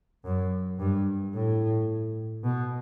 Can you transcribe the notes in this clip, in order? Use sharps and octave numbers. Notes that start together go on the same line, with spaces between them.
F#2
G2
A2
B2